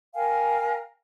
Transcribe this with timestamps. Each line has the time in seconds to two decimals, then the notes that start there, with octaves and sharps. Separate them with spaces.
0.14 A#4 F5 G5 G#5